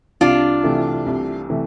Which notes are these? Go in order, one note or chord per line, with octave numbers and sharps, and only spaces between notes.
C2 D4 F4
C3 E3 A3
C2
C3 E3 A3